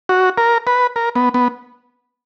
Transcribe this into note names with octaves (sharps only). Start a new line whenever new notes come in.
F#4
A#4
B4
A#4
B3
B3